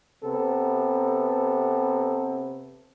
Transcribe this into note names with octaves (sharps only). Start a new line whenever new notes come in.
C3 B3 A4